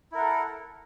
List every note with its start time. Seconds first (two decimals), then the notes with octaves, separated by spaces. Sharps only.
0.12 E4
0.15 A#4
0.18 F#5
0.20 A4